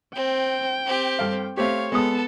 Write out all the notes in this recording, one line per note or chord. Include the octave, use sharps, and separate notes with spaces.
C4 G5
C4 G4
G2 A4 F5
A3 C4 G4 C#5 F5
G#3 B3 A4 A5 D#6